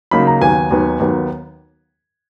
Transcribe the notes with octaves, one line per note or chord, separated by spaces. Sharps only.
C#3 F#3 A#3 D#4 B5
A#5
D#2 D#3 F#3 B3 G#5
D#2 D#3 F#3 B3
D#2 D#3 F#3 B3